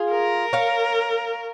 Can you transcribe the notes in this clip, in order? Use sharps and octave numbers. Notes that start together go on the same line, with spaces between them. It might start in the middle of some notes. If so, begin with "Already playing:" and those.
Already playing: F4 G#4
A#4
C#5 F5